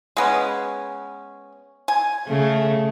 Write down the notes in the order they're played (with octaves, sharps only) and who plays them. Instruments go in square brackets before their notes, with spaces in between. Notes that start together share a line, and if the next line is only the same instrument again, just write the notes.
[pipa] G#3 B3 C#4
G#5
[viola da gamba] C#3 A3